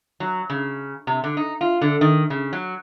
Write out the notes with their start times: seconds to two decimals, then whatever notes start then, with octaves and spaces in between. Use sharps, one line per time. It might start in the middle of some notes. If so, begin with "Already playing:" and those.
0.20 F#3
0.50 C#3
1.07 C3
1.24 D3
1.37 D#4
1.61 F4
1.81 D3
2.01 D#3
2.30 C#3
2.53 F#3